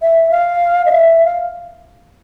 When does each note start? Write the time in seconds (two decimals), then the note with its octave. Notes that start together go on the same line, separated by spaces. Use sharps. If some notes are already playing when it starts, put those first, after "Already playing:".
0.02 E5
0.31 F5
0.86 D#5
0.91 E5
1.25 F5